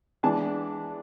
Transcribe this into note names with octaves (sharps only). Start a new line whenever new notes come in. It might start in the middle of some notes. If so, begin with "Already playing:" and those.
E3 G#3 B3 D4 A5